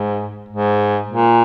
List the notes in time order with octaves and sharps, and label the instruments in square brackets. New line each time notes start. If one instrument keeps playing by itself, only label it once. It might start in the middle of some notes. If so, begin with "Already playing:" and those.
Already playing: [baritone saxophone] G#2
G#2
A#2